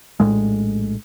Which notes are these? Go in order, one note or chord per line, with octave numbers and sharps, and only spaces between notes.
A#1 F2 A2 G#3